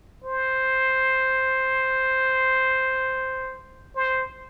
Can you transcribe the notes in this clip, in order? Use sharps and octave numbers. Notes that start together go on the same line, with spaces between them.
C5
C5